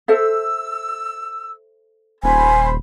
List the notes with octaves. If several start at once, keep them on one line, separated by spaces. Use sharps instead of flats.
A4 C5 E5 E6
D#1 C5 G#5 B5